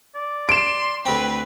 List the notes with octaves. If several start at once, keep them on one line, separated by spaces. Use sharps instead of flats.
D5
C6 D7 E7
D2 C4 B4